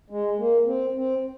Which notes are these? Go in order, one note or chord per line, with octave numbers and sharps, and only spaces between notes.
G#3
A#3
C4
C4